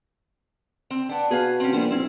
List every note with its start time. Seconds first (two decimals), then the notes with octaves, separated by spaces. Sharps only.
0.90 C4
1.09 B3 D4
1.31 B2 G#4 B4 F5
1.60 C4 C#4
1.73 A#1 G3 B3 C5
1.90 B1 C4 E4